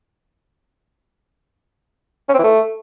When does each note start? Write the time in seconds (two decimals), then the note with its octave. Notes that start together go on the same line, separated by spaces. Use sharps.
2.28 C#4
2.34 C4
2.39 E3
2.44 A3